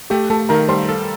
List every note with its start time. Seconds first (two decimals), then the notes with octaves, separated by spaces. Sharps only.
0.10 A3 G4 G5
0.30 A3 A4 A5
0.49 D#3 A#4 A#5
0.69 G3 C5 C6
0.89 A4